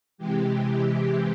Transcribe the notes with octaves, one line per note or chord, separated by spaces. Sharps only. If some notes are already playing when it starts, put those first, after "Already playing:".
C3 E3 G#3 G4